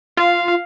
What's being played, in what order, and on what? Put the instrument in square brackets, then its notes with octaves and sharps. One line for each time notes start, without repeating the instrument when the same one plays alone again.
[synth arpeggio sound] F4 [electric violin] F5